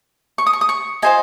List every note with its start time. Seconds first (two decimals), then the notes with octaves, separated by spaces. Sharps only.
0.38 C#6
0.46 D#6
0.53 C#6
0.61 D#6
0.69 C#6
1.02 F4 C5 D#5 G#5